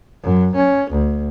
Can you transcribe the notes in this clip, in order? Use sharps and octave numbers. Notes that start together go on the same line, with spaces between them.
F#2
C#4
D2